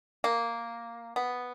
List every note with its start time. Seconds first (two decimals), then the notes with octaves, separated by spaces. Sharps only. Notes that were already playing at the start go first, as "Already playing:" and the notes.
0.24 A#3
1.16 B3